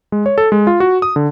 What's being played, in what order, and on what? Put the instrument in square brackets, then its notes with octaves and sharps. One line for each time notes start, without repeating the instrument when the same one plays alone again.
[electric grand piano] G#3
C#5
A4
G#3
F4
F#4
D#6
D3